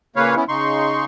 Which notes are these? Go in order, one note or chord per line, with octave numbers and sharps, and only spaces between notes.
A#2 C#3 A#3 B4 C#5 F5
B3 C#4 E4
C#3 D#4 C6 C#6